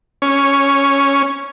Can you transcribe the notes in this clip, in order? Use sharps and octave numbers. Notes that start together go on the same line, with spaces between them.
C#4